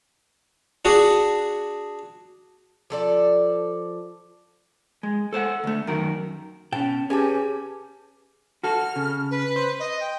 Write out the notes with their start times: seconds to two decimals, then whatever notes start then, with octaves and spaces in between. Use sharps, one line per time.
0.85 D4 F#4 G#4
2.90 F3 A4 D5
5.03 G#3
5.33 A4 C5 C#5 F#5
5.64 D2 A3
5.87 F#2 D#3 A#4
6.72 B2 C#4 G5 A5
7.10 C#4 G4 G#4 B4 G#5 A5
8.64 F#4 A4 F6
8.96 C#3
9.31 B4
9.56 C5
9.80 D#5
10.01 G5